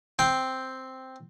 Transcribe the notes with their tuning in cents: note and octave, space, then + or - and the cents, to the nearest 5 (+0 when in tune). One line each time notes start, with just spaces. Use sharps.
C4 +0 G5 +0